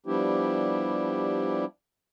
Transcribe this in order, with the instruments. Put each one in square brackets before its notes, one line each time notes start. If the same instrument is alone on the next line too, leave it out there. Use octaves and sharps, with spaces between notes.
[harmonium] F3 G3 B3 D4 E4 G4